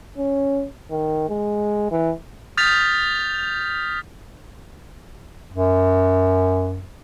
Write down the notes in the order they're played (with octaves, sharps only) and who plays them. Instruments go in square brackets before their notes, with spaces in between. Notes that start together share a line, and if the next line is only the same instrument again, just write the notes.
[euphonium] C#4
D#3
G#3
E3
[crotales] D#6 F6 G6 A6 B6 F7
[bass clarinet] F#2